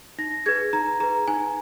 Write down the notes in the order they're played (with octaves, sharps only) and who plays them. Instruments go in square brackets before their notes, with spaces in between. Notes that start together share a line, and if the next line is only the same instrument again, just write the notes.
[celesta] D#4 A#6
G#4 B4 G#6
D#4 A#5
G#4 B4 A#5
D#4 G#5